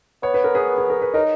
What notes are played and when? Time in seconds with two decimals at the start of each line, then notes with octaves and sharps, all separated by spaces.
0.23 B3 C#5
0.34 B4
0.44 A#4
0.55 G#4 B4
0.78 G#4
0.90 A#4
1.02 B4
1.14 D#4 A#4 C#5